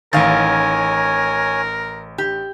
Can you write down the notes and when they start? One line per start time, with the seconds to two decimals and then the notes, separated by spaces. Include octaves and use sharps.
0.13 A1 D#3 A#4 C#5 F5 G#5 A6
2.18 G4